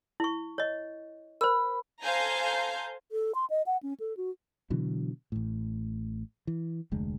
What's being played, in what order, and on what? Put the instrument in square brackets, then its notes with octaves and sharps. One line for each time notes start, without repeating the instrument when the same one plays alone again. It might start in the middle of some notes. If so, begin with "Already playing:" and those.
[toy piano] E4 C#6
C#5 D#5
[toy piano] A#4 C5 [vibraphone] B5
[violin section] A4 C5 F5 G#5 A#5 G6
[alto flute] A4
C6
D#5
F#5
C#4
A4
F#4
[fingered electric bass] B2 D3 E3 F#3
A1 A2
E3
F1 D2 G#3